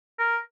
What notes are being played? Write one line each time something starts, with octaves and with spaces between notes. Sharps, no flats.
A#4